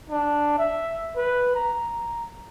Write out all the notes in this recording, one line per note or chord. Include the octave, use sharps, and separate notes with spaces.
D4
E5
B4
A#5